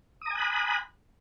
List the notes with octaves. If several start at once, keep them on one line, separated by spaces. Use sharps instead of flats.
G#5 A#5 B5 D#6 F#6